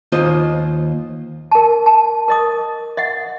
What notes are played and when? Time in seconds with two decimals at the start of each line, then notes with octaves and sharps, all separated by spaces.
0.12 D#2 A#3 F4 C5 D#5
1.52 A#4 A5
1.86 A5
2.28 A#4 D#5 D#6
2.97 D#5 E5 F#5